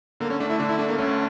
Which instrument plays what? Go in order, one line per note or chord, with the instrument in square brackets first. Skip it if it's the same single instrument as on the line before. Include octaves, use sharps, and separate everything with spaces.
[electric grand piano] D3 [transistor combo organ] A#3
[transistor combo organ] C#4
[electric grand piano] A3 [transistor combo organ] D4
[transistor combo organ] E4
[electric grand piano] D3 [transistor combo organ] D4
[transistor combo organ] E4
[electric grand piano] A3 [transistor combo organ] D4
[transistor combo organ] A#3
[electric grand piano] D2 [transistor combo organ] C#4